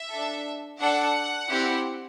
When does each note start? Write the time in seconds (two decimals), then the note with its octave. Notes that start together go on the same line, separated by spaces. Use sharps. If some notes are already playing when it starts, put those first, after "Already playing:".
Already playing: E5
0.12 D4 A4
0.80 D4 A4 F#5
1.49 C4 E4 G4